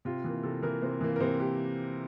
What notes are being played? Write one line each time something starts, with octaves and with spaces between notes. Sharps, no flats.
C3 F4
E3 A#3
C3 A4
E3 A#3 A#4
C3 C5
E3 A#3
A#4
C3 C5
A#3 G4